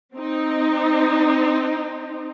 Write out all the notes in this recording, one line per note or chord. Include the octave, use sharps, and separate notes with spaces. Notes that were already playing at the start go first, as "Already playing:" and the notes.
C4 D#4